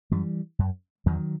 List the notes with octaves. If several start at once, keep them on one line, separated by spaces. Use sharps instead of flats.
F#2 E3 G3
F#2
E2 D#3 F#3